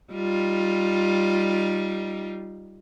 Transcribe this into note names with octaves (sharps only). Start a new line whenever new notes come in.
G3 D#4 F4